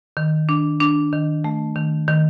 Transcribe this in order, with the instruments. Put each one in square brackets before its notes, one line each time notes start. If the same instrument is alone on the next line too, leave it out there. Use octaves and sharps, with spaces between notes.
[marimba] D#3
D4
D4
D#3
A3
D#3
D#3